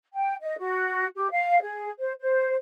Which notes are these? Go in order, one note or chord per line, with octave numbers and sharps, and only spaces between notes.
G5
D#5
F#4
G4
F5
G#4
C5
C5